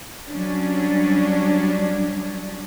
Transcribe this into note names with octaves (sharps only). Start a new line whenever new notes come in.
F#3 G3 C#4 D4